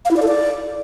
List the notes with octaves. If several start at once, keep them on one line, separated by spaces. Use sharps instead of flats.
F5
E4
D5
A4
D5